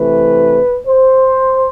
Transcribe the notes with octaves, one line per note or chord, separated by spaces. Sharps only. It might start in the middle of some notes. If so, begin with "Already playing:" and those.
Already playing: C3 E3 A3 B4
C5